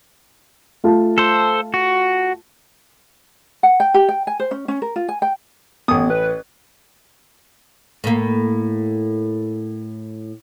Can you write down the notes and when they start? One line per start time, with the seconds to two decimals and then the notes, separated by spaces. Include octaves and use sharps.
0.84 A3 F4 A5
1.18 A4 C5
1.74 F#4
3.63 F#5
3.80 G5
3.94 G4
4.09 G5
4.27 G#5
4.40 C5
4.51 C#4
4.68 C#4
4.82 A#4
4.96 F4
5.08 G#5
5.22 G5
5.88 A1 B3 D#6
6.10 B4
8.04 A2 A#3